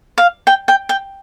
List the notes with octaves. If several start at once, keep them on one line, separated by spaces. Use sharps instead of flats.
F5
G5
G5
G5